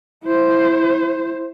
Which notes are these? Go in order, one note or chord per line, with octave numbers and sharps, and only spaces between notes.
E4 C5